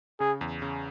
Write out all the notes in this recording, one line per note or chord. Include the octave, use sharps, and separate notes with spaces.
C#3 G#4
E2
C#3